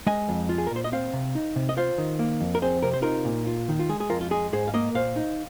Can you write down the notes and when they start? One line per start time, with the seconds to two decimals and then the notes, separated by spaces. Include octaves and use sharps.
0.07 G#3 D#5 G#5
0.29 F2
0.49 F4
0.58 G#4
0.67 A#4
0.71 A#2 C5
0.84 D#5
0.92 C4 C5 F5
1.13 C3
1.35 D#4
1.56 C3
1.69 D#5
1.77 F4 C5 F5
1.98 D#3
2.19 A#3
2.41 F2
2.55 A#4
2.62 C4 G#4 C5
2.82 C3 A#4
2.93 C5
3.02 D#4 F4 A#4
3.25 A#2
3.47 F4
3.69 D#3
3.79 F4
3.89 G#3 G#4
4.00 G#4
4.10 F2 F4 A#4
4.21 F4
4.31 G#3 G#4
4.53 G#2 G#4 C5
4.67 F5
4.74 A#3 A#4 D#5
4.95 A#2 C5 F5
5.16 D#4